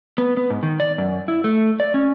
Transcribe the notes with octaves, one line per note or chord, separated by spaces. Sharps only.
B3
B3
G#2
D#3
D5
F#2
E4
A3
D5
C#4